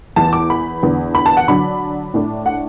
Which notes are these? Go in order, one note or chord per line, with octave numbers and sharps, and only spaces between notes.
E2 E3 B3 A5
D6
B5
E2 D3 B3
B5
A5
F#5
D3 F#3 D4 B5
A2 A3 D4
F#5